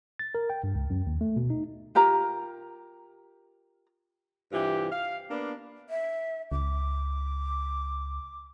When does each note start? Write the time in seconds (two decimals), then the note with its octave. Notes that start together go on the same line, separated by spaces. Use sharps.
0.19 A6
0.35 A#4
0.50 G5
0.64 G2
0.75 C#2
0.90 F#2
1.07 D#2
1.21 A3
1.36 B2
1.50 D#4
1.95 F4 G4 A#4 A#5
4.52 G2 C3 E3 F4 G4
4.92 F5
5.30 A#3 B3 D4
5.90 E5
6.52 C#2 D6